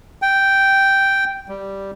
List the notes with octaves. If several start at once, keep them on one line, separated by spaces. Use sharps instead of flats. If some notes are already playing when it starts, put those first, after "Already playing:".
G5
G3